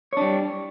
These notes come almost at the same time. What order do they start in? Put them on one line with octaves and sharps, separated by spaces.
C#5 D4 G3